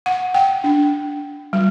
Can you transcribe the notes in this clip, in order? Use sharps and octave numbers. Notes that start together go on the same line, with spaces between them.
F#5
G5
D4
G3